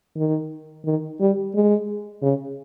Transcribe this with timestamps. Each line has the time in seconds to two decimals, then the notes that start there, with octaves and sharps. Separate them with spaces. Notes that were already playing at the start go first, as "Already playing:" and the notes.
0.16 D#3
0.85 D#3
1.20 G3
1.55 G#3
2.22 C#3